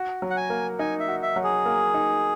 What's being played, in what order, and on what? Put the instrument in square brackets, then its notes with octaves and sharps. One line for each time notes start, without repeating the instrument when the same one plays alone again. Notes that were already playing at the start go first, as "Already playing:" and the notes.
Already playing: [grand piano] F#4
F#3
[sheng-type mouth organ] F#5
G#5
[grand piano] A#3
[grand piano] D#4 [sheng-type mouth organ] G#5
[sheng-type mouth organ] E5
[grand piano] F#4
[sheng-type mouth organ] E5
[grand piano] F#3
[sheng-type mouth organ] G#4
[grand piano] A#3
D#4